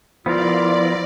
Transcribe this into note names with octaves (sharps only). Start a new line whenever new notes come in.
F3 B3 E4 F4 A#4 D5